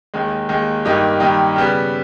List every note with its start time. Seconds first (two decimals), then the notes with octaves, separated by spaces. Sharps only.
0.14 D#2 D#3 G#3
0.49 D#2 D#3 G#3
0.85 G2 D#3 A#3 D#4 G4
1.20 G2 D#3 A#3 D#4 G4
1.56 C#3 G3 B3